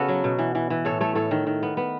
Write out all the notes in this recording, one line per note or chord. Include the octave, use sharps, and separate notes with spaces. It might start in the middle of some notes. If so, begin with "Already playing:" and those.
Already playing: C#3 B3 F#4 A4
F#3
B2
E3
E3
E3
A2 A4 C#5
A3 A4 C#5
A2 A4 C#5
D#3
D#3
B3
B3